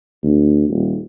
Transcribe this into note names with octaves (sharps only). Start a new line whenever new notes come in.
D2
D#1